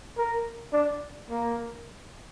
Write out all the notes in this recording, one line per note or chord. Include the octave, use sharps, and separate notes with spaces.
A#4
D4
A#3